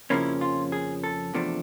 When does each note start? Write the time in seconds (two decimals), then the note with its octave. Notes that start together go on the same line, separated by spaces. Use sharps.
0.10 F2 C#3 F3 A#3 C#4 E4
0.41 F4
0.72 G#4
1.04 A4
1.34 E2 C3 F3 A3 D4